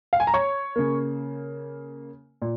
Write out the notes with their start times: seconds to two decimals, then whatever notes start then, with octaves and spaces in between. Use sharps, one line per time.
0.13 F5
0.20 G#5
0.27 A#5
0.34 C#5 C#6
0.76 C#3 A#3
2.42 A#2